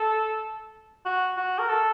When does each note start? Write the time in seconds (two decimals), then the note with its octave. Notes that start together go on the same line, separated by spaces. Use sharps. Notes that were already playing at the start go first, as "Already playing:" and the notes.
Already playing: A4
1.06 F#4
1.37 F#4
1.59 A#4
1.69 A4